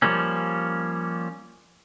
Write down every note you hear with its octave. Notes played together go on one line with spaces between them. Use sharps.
F3 G3 A#3 C#4